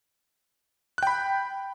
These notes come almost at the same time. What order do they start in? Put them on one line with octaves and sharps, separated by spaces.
F#6 G5 B5